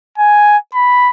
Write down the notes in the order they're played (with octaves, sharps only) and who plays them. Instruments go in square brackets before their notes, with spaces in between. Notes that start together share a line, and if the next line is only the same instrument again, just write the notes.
[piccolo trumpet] G#5
B5